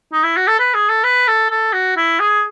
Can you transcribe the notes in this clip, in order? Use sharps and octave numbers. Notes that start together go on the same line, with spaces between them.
D#4
E4
F#4
A4
B4
G#4
A4
B4
A4
A4
F#4
E4
G#4